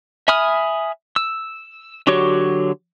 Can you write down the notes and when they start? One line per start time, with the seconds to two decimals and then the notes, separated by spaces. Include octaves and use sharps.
0.28 E5 G#5 B5 D#6 F6
1.16 E6
2.07 D3 F#3 F#4 G4 C#5